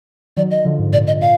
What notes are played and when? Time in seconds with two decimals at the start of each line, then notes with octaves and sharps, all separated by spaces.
0.37 D#3 F#3 D5
0.51 D#5
0.65 D3 F3
0.79 G#2
0.93 A#2 D5
1.07 D#5
1.21 A#2 F5